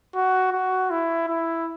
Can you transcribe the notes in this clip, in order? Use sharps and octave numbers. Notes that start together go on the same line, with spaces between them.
F#4
F#4
E4
E4